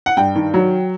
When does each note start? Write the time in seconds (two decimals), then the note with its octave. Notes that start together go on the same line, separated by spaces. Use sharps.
0.06 F#5
0.17 G2 G5
0.35 D#3
0.54 F#3